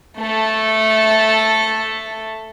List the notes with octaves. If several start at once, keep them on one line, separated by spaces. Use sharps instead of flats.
A3 A4